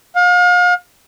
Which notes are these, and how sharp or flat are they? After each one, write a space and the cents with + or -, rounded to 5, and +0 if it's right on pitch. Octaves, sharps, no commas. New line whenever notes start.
F5 +40